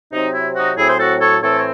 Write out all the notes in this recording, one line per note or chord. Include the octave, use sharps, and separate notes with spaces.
C3 F#3 C4 D#4
E4
D#4 F#4
A2 F#3 C4 E4 G#4
C5
F#4 A4
A4 C#5
A2 E3 C4 A4 C#5
C#5